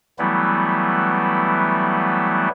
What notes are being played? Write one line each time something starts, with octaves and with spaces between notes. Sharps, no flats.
E3 F#3 G3 A3 B3 E4